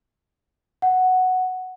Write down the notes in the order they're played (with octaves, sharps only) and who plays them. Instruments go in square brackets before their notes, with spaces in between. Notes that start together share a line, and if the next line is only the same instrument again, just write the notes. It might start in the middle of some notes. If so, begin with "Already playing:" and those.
[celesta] F#5